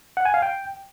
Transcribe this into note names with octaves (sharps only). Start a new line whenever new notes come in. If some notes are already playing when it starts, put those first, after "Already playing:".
F#5
G#5
F5
G5